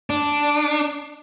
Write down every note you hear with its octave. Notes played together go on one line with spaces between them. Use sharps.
D4